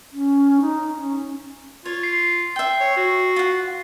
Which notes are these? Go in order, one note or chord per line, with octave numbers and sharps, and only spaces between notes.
C#4
D#4
C#4
F4 C#5
C7
E5 G5
C#5
F#4
F4 F#5